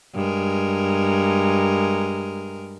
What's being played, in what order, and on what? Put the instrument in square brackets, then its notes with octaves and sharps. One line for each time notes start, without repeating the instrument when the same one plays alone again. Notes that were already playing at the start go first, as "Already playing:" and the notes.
[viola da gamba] G2 G#3 A#4